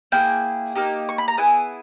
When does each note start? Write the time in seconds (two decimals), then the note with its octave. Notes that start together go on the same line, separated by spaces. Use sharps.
0.12 A#3 E4 G#4 G5
0.75 A#3 D#4 G4
1.09 C#6
1.18 B5
1.28 A#5
1.37 B3 E4 G#4 G#5